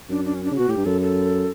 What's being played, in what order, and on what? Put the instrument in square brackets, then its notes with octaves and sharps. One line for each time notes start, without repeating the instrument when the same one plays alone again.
[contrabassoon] F#2 [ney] D4
[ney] D4
C#4
D4
[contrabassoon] C#3
[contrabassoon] B2 [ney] F#4
[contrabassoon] A2 [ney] G4
[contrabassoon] G2
[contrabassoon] F#2 [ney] A4
[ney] A4